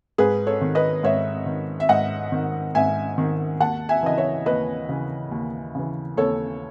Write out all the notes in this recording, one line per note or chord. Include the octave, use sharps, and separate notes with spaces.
G#2 G#4 B4
A4 C#5
D#3
B4 D#5
G#2 C#5 E5
D#3
E5
G#2 D#5 F#5
D#3
G#2 E5 G#5
D#3
D#2 F#5 A5
E5 G#5
C#3 E3 D#5
C#5 E5
D#2 B4 D#5
C#3 E3
D#2
C#3 E3
D#2 A4 C#5